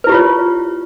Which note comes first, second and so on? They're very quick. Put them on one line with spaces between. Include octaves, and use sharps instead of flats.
B4 E4 G4 F4 C#5